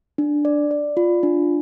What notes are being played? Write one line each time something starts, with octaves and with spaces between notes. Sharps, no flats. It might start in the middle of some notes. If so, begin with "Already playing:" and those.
D4
D5
D5
F4
D4